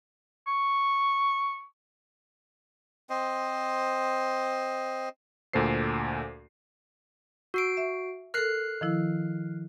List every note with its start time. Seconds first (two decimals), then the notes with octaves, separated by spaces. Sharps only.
0.47 C#6
3.10 C4 C5 D#5
5.53 D2 A#2 A4 C5 C7
7.54 F#4 E6 C7 D7
7.77 E5
8.34 A4 A#4 F6 F#6 C7
8.81 D#3 F3 E4